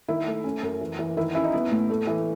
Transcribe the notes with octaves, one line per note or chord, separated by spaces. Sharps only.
D#3 E4
A3
C#4
F#2
E3
E3
D#3 E4
C#4 E4
D#4
B3 E4
A2
A3
E3